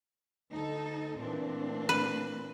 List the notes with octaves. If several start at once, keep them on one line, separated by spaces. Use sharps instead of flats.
D2 D#4 A4
A#2 E3 A3 C4 D4
B4